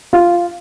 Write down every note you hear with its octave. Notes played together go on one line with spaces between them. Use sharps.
F4